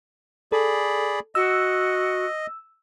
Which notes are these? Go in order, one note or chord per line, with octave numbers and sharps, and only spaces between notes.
G#4 A4 D5 B5
F#4 D#5 E6